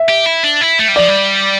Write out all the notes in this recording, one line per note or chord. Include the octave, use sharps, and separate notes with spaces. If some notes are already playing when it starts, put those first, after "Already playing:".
Already playing: E5
G4
E4
D4
E4
A3
G3
F3 D5
G3